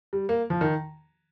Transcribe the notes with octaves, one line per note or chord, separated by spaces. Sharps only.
G3
A#3
F3
D#3